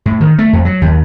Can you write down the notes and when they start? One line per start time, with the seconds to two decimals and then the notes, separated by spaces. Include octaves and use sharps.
0.06 A2
0.21 D#3
0.38 A3
0.53 F2
0.65 F#3
0.82 D#2